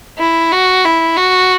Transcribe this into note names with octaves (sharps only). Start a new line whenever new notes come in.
E4
F#4
E4
F#4